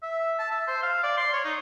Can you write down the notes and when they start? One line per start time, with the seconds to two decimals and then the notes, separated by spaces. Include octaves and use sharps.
0.02 E5
0.39 A5
0.51 E5
0.68 C5
0.83 F5
1.03 D5
1.17 C6
1.33 C#5
1.45 D#4